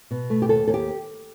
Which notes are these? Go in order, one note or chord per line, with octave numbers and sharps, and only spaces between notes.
B2
A3
G4
D#2 A4
D#2 A4
G4